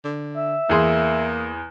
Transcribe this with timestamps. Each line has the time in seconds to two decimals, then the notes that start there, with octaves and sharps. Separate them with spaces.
0.05 D3
0.37 E5
0.70 E2 A#3 G#4 C6